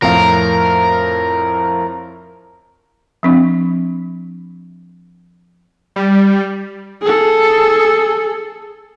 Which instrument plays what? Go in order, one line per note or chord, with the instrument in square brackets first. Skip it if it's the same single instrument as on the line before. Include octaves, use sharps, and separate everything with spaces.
[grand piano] F2 A2 F5 [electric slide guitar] A#4
[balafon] F3 C4 D4
[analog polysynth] G3
[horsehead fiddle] G#4 A4